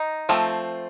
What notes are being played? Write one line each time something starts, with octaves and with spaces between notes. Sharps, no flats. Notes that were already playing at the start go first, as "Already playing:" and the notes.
Already playing: D#4
F3 A3 C4